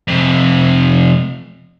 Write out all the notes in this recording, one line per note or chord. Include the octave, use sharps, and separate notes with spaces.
F2 C3